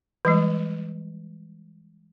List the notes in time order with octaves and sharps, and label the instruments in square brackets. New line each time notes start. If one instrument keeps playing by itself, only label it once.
[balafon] E3 G3 G#3